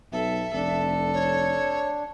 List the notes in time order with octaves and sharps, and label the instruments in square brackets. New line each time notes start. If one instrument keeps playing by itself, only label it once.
[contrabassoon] B1 [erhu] A4 [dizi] E5
[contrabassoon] F1 [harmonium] D4 [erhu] A4
[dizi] C#5